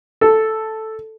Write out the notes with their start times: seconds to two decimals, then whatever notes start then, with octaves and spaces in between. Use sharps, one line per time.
0.21 A4